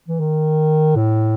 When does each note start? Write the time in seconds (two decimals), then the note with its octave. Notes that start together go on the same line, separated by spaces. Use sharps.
0.08 E3
0.19 D#3
0.96 A2